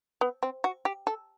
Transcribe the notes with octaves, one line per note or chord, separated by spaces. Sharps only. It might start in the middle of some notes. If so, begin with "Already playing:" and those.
B3
C4
F#4
G4
A4